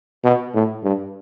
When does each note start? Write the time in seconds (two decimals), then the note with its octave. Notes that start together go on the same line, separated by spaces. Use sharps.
0.25 B2
0.54 A2
0.84 G2